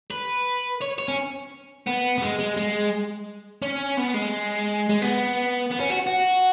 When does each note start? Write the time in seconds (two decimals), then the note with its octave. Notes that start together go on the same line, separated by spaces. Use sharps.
0.11 B4
0.81 C#5
0.98 C#5
1.08 C#4
1.87 B3
2.18 B3
2.22 G#3
2.39 G#3
2.57 G#3
3.62 C#4
3.97 B3
4.14 G#3
4.89 G#3
5.02 B3
5.72 B3
5.80 C#4
5.90 F#4
6.07 F#4